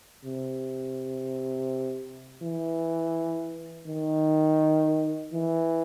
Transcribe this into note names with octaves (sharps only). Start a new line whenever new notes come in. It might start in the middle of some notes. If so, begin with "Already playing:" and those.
C3
E3
D#3
E3